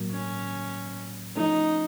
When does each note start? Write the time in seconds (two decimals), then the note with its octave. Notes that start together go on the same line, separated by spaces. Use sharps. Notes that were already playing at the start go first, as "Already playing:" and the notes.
Already playing: A2 F#3 A#3
0.12 C#4
1.36 F3 A3 C#4 D#4